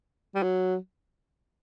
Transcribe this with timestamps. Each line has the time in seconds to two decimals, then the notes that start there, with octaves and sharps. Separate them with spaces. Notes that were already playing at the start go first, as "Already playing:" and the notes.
0.35 G3
0.43 F#3